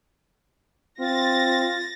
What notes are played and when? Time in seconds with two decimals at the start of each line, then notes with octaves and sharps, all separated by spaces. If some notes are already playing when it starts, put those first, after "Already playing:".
1.00 C4 F4 A6 A#6